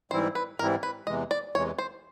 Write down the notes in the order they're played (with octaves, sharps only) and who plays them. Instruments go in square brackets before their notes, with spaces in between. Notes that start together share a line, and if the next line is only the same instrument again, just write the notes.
[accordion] G#2 E3 G3 C4 E4 [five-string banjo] C5
[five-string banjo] B4
[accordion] G#2 E3 G3 C4 E4 [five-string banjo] A#4
[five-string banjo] B4
[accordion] E2 C3 E3 G#3 [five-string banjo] D#5
[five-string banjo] D5
[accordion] E2 C3 E3 G#3 [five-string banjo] C#5
[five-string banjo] C5